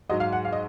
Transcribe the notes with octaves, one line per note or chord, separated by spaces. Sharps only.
G#2 F#3 D#5
F5
F#5
F5
D#5